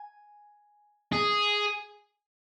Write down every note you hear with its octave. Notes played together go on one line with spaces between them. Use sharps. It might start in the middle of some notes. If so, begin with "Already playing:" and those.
Already playing: G#5
G#4